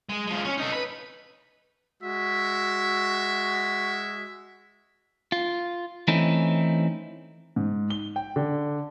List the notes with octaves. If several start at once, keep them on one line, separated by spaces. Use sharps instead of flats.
G#3
F3 G#3
C#4 C#5
D#4 A4
B4
G#3 F#4 E5
F4
E3 A3 C4 C#4 D#4 E4
G#2
G7
G5
D3